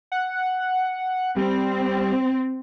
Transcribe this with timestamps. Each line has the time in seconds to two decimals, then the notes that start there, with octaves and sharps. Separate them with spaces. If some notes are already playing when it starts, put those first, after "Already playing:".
0.12 F#5
1.36 G3 C4